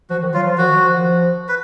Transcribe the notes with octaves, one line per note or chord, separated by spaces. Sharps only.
F3 F#4
D#3
F#3 F4
F3
D#3 F#4
F3
B4